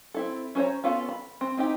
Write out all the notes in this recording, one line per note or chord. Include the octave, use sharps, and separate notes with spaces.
C4 E4 A4
C#4 A#4 C5 C#5 A#5
B3 C#4 F4 A4 F5
B5
C4
C4 D#4 E4 G4